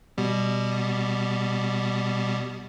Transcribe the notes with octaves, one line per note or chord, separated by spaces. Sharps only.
B2 G3